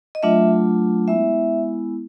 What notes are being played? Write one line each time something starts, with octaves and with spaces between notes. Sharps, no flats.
D#5
F#3 A3 D4 F4 E5
G#3 B3 E4 E5